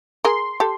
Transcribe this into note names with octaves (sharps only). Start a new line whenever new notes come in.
G#4 A#4 C6
G4 A4